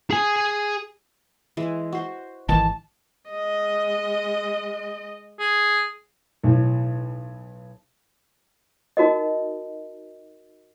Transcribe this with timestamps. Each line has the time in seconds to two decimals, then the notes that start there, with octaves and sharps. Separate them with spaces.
0.11 G#4 G#5
1.57 E3 G#3
1.92 F#4 C5
2.49 G#1 D#3 E3 A5
3.30 G#3 D#5
5.39 G#4
6.43 B1 A2
8.97 D#4 F#4 A#4 D#5